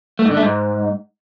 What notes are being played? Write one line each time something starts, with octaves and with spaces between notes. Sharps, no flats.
A3
G#2
D3
A3
G#2